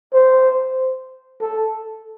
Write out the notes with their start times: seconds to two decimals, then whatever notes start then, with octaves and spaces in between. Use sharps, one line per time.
0.14 C5
1.41 A4